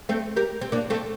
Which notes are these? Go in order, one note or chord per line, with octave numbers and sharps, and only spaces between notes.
A3 C4
G4 A#4
C4
A#3 D4
A3 C4